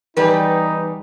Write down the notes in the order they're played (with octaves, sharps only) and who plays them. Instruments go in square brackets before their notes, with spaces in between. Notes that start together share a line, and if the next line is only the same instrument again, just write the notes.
[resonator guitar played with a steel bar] E2 G4 B4 [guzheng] G3 [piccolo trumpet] D#4